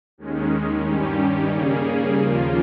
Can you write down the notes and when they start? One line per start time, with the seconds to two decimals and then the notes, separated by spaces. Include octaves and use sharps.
0.18 D#2 D#3 G#3 C#4
0.84 G2 D#3 G3 C#4 G4
1.49 C#3 G3 A#3 C#4 G#4
2.16 D#2 C#3 F3 A#3 F4